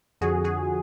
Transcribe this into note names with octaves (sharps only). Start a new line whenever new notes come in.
F2 D3 F3 F#4 G#4
F#4 G#4